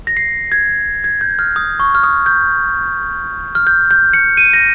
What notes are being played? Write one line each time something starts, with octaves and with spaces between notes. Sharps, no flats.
A#6
C7
G#6
G#6
G6
F6
D#6
C#6
F6
D#6
G6
F6
G6
G6
C#7
D#7
A#6